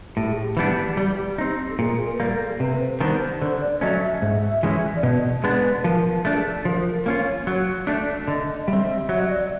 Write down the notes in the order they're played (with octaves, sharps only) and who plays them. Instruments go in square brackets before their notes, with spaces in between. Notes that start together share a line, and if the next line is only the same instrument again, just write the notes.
[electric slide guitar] A2 [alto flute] G4
[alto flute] G#4
G4
[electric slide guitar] E3 G3 B3 D4
G3
C4 D#4
[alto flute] A4
[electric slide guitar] A#2 [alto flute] G#4
[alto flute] A#4
B4
[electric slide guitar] G3 A#3 [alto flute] A#4
[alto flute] A4
[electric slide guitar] C3 [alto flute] B4
[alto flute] C5
[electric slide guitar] D#3 G3 B3 D4 [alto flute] C5
[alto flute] C5
[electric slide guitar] D3 [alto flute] C5
[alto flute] D5
[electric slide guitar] F#3 A3 C#4 [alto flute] D#5
[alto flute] E5
[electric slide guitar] G#2
E3 G#3 C#4 E4
[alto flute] D5
[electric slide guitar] B2 [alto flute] D#5
[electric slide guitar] G#3 B3 D4 [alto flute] B4
[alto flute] B4
[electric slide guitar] F3 [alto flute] A#4
[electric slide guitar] A3 D4 [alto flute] A4
[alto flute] G#4
A4
[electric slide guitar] F3 [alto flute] A#4
[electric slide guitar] A#3 C#4 F4 [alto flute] C#5
[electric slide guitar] F#3
[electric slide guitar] A3 D4 [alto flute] D5
[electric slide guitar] D3 [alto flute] D#5
[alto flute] D#5
[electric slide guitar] G3 [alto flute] E5
[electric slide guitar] C4
[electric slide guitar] F#3 [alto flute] E5
[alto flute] D#5
D5